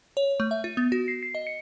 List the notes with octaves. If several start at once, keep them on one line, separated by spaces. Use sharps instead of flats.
C#5
A3
E5
F4
B3
F#4
C7
C7
D#5
C#7